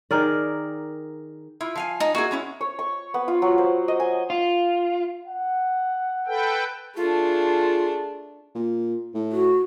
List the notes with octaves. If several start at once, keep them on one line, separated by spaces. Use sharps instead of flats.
D#3 G#4 A#4 D5
E4 F4
F3 F5 G#5
D#4
A#3 E4 F#4 G#4
G#3 C#4 E4
C#5
C#6
B3
F4
F#3
C5
D#5
G#5
F4
F#5
A4 B4 G5
A3 D4 F4 G#4
A#2
A2
F#4